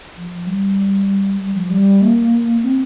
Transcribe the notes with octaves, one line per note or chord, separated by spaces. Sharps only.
F3
G3
G3
F3
G3
A#3
C4